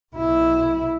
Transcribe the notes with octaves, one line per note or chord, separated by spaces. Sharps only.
B1 E4